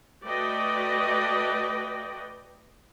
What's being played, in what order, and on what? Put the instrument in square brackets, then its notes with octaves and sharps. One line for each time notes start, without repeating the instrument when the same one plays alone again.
[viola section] A3 F#4 B4 D5 D#5 G5